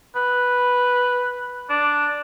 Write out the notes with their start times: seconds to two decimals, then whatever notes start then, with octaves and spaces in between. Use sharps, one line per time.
0.16 B4
1.70 D4